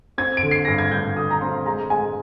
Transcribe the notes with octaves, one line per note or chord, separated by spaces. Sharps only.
C4 G#6
D7
D3
C7
G2 A#6
G#6
G2 G6
D3 D#6
A#5
C4 C6
G#3 A#5
G#3 G#5